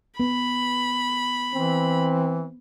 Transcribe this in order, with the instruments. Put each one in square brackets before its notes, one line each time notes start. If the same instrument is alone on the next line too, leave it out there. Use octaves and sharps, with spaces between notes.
[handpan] B3 [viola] B5
[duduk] E3 [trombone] C4